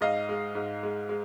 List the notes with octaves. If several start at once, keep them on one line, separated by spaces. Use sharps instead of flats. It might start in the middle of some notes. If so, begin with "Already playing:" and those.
G#2 D#5 F5
G#3
G#2
G#3
G#3